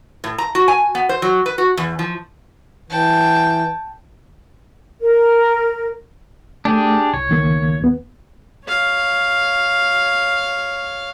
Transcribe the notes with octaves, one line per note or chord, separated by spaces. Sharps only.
A2
A#5
F#4
G#5
B3
C5
F#3
B4
F#4
E2
F3
E3 G5 A5
A#4
A3 D4 G4 G#4
C2 C#5
C#2 D#3 A#3
D#2 B3
C#5 F5